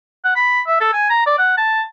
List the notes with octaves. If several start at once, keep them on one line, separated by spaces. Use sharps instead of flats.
F#5
B5
E5
A4
G#5
A#5
D5
F#5
A5